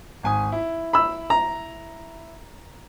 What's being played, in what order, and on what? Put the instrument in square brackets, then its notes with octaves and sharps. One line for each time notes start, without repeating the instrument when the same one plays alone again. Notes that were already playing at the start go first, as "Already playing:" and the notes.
[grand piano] G#1 G#5 D#6
E4
[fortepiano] B5 E6
A#5